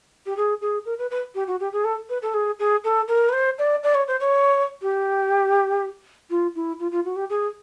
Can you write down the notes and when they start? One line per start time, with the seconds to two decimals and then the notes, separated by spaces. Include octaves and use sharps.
0.26 G4
0.37 G#4
0.61 G#4
0.85 A#4
0.99 B4
1.11 B4
1.35 G4
1.47 F#4
1.60 G4
1.73 G#4
1.84 A4
2.09 B4
2.22 A4
2.34 G#4
2.59 G#4
2.84 A4
3.08 A#4
3.29 B4
3.33 C5
3.59 D5
3.83 D5
3.95 C#5
4.08 C5
4.20 C#5
4.82 G4
6.30 F4
6.55 E4
6.80 F4
6.92 F4
7.05 F#4
7.16 G4
7.30 G#4